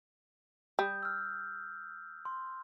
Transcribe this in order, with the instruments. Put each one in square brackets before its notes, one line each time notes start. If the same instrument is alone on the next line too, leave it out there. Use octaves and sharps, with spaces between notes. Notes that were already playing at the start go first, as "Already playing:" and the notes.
[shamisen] G3 [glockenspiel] D#6 G6
[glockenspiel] E6 F6
C6